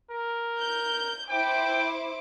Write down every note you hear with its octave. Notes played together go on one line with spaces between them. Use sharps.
A#4
G6
E4 C5 G5 D6